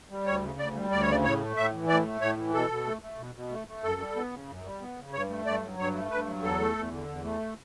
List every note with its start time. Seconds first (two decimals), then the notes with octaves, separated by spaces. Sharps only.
0.10 G3
0.26 D2 C#5
0.43 C#3
0.59 D2 D5
0.75 G3
0.91 D2 D5
1.02 C#5
1.07 C#3 D5
1.24 A2 C#5
1.40 A3
1.56 A2 E5
1.73 E3
1.88 A2 D5
2.05 A3
2.21 A2 C#5
2.37 E3
2.54 B2 A4
2.70 B2
2.87 A3
3.02 A3
3.18 B2
3.35 B2
3.51 A3
3.67 A3
3.83 F#2 A4
4.00 G3
4.16 B3
4.32 C#3
4.48 F#2
4.65 G3
4.81 B3
4.97 C#3
5.13 G2 C#5
5.30 A3
5.46 G2 D5
5.62 F#3
5.79 G2 C#5
5.94 A3
6.11 G2 B4
6.27 F#3
6.43 E2 A4
6.60 A3
6.76 E2
6.92 D3
7.08 E2
7.24 A3